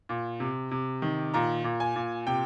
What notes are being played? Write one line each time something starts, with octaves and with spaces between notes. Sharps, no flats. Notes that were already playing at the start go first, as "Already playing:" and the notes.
A#2
C3
C3
D#3
A#2 A#5
A#2
G#5
A#2
C3 G5